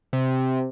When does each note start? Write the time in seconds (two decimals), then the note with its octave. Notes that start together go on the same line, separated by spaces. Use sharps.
0.13 C3